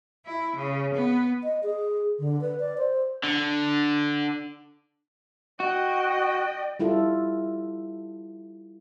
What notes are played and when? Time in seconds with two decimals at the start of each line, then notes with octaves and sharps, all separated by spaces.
0.24 E4
0.54 C#3
0.92 B3
1.43 D#5
1.63 G#4
2.19 D3
2.41 B4
2.60 D5
2.77 C5
3.23 D3
5.60 F#4 D#5 G5
6.79 G3 E4 F4 A4